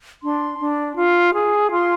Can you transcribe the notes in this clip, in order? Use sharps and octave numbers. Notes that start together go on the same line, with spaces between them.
D4 C6
D4
F4
G#4
F4 C6